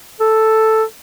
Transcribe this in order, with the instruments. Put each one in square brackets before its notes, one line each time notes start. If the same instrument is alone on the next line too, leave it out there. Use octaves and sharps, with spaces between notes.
[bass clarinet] A4